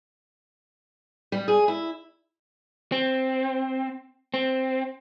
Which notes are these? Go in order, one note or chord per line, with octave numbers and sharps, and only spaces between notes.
G3
G#4
E4
C4
C4